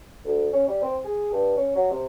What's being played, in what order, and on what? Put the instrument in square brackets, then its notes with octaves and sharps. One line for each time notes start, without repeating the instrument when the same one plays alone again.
[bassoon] D2
C#4
G3
C4
G#4
G2
C#4
F#3
C3